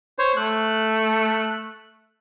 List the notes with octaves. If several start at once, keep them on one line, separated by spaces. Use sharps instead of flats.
C5 C#5
A3 F#6